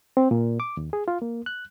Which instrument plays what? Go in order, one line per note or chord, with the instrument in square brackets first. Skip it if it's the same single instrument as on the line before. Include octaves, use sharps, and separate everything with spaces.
[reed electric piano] C4
A#2
D6
D#2
G#4
F4
A#3
F#6